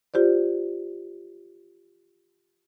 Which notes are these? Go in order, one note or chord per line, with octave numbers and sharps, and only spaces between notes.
F4 G4 C5 D5